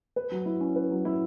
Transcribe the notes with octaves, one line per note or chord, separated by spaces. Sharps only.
B4
F#3
E4
C#4
B4
F#3
E4